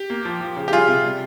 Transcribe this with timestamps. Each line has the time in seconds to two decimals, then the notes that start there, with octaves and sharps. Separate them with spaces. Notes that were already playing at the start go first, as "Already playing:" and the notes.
Already playing: G4
0.10 A#3
0.25 F3
0.41 F3
0.57 C#3
0.68 G4
0.73 G3 F4 G#4
0.88 C3
1.04 G3